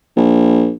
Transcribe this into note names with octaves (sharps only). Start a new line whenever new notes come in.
A#1